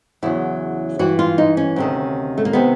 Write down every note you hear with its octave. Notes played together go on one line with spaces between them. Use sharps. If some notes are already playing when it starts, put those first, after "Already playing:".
E2 C#3 F#3 E4
G2 E3 F#4
F4
D#4
C#4
D2 C3 D#3
A3
A#3
C3 D#3 B3